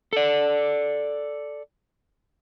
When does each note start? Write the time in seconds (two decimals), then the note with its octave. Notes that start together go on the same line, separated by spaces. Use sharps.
0.13 A4 D5